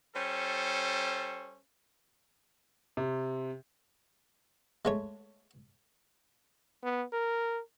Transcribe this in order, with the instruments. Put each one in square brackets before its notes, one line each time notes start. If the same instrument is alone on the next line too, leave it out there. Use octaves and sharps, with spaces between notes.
[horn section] G3 C#4 A4 C5
[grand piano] C3
[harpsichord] G#3 A3 C#5
[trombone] B3
A#4